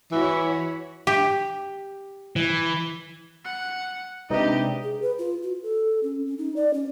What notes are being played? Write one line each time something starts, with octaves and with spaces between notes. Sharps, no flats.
E3 E4 F#4 C#5
G4
E3
F#5
C3 G#3 D4 D#4 G4 B4 D5 D#5
G#4
B4
F4
F#4
A4
C#4
C#4
D#4
D5
C#4